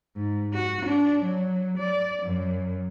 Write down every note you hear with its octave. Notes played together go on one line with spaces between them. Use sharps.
G#2
F#4
D4
F#3
D5
F#2